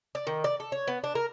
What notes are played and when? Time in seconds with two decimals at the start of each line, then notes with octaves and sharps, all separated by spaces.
0.15 D5
0.27 D#3
0.44 D5
0.60 A4
0.72 C#5
0.88 B3
1.04 D4
1.15 A#4